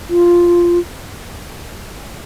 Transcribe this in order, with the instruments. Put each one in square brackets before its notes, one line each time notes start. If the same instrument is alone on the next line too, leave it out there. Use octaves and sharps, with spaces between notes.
[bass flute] F4